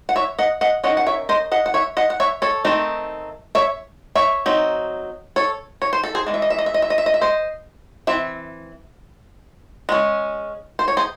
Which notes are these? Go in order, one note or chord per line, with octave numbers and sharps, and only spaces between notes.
F#5
C#5 E5
D#5 F#5
D#5 F#5
D#3 F#3 C#4 D#5 F#5
F#5
C#5 E5
C5 D#5
D#5 F#5
F#5
C#5 E5
D#5 F#5
F#5
C#5 E5
A4 C#5
D#3 A3 C4 D#4
C#5 E5
C#5 E5
F#3 C4 D#4
A4 C#5
C#5
C5
A4
G#4 C5
E3 G#3
E5
D#5
E5
D#5
E5
D#5
E5
D#5
E5
D#5
E5
C5 D#5
E3 C4 E5
G#3 C#4
C5
C#5
G#4 C5